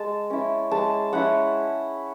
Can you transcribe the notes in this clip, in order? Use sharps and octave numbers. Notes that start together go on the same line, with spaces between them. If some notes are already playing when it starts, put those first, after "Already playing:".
Already playing: G#3 A5
C#4 E4
G#3 A5
C#4 E4 F#5